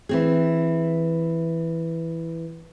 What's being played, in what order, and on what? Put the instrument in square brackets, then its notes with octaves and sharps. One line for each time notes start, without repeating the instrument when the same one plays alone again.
[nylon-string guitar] E3 C4 G#4